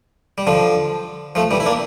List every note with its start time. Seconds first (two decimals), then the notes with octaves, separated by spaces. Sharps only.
0.38 G3
0.47 D3 F3
1.35 F3 A3
1.51 E3 G3
1.60 E4
1.66 A#3 D4